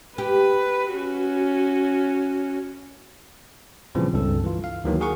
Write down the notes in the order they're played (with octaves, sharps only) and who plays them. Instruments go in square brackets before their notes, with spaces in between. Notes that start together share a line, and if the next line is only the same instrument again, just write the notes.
[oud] G4 [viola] B4
[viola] C#4 F#4
[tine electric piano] A#2 C#3 E3 F3 G3 C4
C#2 G2 C4 A4
E3 F4
F5
D2 D#3 E3 F#3 A#3
F#4 G#4 A#4 F#5 C#6